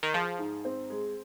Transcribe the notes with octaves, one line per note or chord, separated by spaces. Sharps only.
D#3
F3 G#4
G#2
C4
G#3